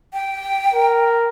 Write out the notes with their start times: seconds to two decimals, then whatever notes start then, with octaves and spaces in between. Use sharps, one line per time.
0.13 G5
0.74 A#4